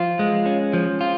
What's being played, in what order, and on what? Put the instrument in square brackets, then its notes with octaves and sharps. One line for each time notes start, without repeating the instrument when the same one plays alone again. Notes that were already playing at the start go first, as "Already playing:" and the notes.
Already playing: [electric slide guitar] F3 F4
G#3
C#4
F3
F4